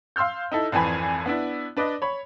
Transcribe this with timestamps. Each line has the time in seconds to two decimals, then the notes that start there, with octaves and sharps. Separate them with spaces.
0.16 F5 C6 E6 F6 G6
0.52 D#4 E4 A4
0.72 G#1 F2 E3 G#5 B5
1.26 B3 D4 E4
1.77 D4 B4 D5 D#5
2.02 C#5 B5